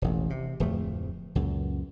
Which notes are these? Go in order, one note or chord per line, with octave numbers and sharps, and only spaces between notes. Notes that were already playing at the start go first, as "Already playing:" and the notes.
E1 A1
C3
D1 F2 F3 A3
C#2 F#2 A#2